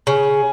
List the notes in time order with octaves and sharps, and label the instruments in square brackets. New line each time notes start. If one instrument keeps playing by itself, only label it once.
[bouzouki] C#3 [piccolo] G#5